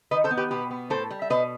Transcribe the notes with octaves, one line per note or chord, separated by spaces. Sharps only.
D#3 B4 D#5
A4 C5
B3
G4 B4
B2 G4 B4
B3
A2 A4 C5
G3
E5
B2 B4 D#5